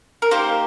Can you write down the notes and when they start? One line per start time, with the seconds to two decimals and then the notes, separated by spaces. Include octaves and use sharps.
0.22 A#4
0.31 A#3 D#4 G4 C5